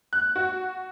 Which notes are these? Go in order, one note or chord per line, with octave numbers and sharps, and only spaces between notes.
F#6
F#4